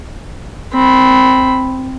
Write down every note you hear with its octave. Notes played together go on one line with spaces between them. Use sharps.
C4 B5